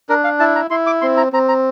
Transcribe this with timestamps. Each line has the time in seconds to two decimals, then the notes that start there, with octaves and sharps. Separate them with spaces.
0.09 D4 A#4
0.24 F5
0.40 E4 A5
0.56 A#5
0.70 E4 C6
0.86 D6
1.02 C4 C6
1.17 A#5
1.33 C4 A#5
1.49 A#5